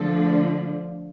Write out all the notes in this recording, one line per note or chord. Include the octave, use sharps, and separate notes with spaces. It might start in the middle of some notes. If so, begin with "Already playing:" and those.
Already playing: D3 F3 A3 D4 A4